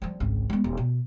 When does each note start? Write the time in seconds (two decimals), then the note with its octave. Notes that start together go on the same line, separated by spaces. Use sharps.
0.02 F3 G3
0.20 G#1 C#2
0.50 G#3 B3
0.64 D#1
0.77 B2